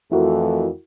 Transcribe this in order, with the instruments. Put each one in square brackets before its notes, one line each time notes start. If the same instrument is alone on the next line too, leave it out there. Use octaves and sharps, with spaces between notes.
[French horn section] F2 E3 A3 [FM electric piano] E4 F#4 A#4